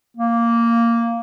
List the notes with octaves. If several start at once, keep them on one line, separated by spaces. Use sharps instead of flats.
A#3